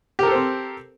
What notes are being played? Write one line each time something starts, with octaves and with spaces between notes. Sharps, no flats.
C4 G4 A4 A#4 C5